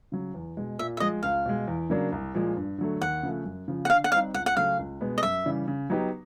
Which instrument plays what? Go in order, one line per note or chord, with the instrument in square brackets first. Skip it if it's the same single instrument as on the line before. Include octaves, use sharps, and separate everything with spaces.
[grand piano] C#3 F#3
E2
B2 G#3
[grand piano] A#2 [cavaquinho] E5
[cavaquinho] E5
[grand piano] F3 G#3 [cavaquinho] D#5
[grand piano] C#2 [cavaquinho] F5
[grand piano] B2 G#3
E2
C#3 F#3 A#3 D4
C2
A#2 F3 G#3
G2
D3 F#3 A3
[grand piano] D#2 [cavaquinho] F#5
[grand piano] C#3 F3 A3
F#2
C#3 F3
[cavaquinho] F#5
[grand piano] D3 [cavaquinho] F5
[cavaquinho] F#5
[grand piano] G3 [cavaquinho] F5
[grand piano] C4 D#4
[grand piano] C#2 [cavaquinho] F#5
[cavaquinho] F#5
[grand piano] C#3 F#3 A3 C#4 [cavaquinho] F5
[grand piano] C#2
B2 G#3 B3
[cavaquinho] D#5
[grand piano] F#2 [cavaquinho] E5
[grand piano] C#3 E3 G3
C#3
F#3 B3 D#4 G4